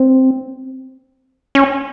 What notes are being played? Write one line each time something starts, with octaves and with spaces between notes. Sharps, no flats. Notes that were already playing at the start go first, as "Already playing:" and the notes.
Already playing: C4
C#4